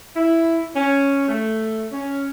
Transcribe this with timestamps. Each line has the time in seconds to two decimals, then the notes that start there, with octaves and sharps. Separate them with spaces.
0.17 E4
0.76 C#4
1.29 A3
1.92 C#4